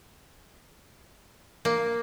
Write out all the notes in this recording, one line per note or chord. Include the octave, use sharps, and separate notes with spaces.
A#3